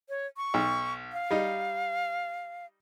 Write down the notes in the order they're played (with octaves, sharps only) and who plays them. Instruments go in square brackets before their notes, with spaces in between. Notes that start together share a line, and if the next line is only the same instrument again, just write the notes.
[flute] C#5
C#6
[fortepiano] B1
[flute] F5
[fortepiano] G3 D#4